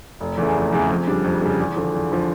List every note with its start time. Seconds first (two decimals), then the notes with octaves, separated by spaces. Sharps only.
0.20 F1
0.37 E2 C#3 E3 A3
0.55 F1
0.73 E2 C#3 E3 A3
0.90 F2
1.07 C#3 G3 D4
1.24 F2
1.42 C#3 G3 D4
1.60 E2
1.76 D3 F3
1.94 E2
2.12 D3 F3